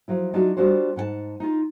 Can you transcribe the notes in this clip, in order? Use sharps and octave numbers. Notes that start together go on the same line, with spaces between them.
F3 F#3 E4
F#3 D4 D#4 F4 F#4
G3 B3 D4 F4 F#4 C5
G#2 F#5 G5 A5
D#4 F4